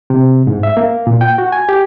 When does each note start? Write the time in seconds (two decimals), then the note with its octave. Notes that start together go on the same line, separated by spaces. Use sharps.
0.10 C3
0.47 G#2
0.63 E5
0.77 A#3
1.07 A#2
1.21 G5
1.38 F#4
1.52 G#5
1.69 G4